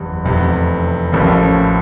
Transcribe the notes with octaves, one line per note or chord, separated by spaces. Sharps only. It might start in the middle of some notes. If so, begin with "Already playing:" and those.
Already playing: F#1 E2 C3
F1 E2 C3
A1 A2 F3 A#3 C#4